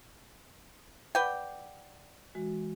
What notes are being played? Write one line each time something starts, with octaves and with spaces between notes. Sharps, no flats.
B4 D5 F#5 G5 D6
E3 G#3 F#4